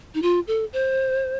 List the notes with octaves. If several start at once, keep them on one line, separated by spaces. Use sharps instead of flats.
D#4
F4
A4
C5